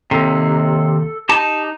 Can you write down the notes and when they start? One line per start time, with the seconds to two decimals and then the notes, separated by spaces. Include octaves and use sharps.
0.11 D#2 C3 A4
1.29 D#4 G4 A5